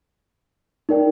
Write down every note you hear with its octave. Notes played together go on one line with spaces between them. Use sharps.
D#4 A#4 D5 G5